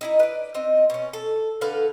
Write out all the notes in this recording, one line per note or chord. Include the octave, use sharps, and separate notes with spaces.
D#4 E4 D#5
B4 D5
C4 D#4 D#5
B2 C#4
A4
D3 A4 B4 F5